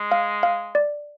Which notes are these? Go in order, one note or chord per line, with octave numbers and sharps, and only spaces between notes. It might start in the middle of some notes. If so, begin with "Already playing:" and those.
Already playing: G#3
F5
F5
D5